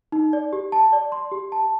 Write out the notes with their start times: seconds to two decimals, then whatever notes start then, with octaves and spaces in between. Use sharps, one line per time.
0.12 D#4
0.33 D5
0.53 G4
0.72 A5
0.93 D5
1.12 C6
1.31 G4
1.52 A5